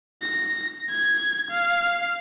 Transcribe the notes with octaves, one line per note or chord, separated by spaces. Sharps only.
A#6
G#6
F5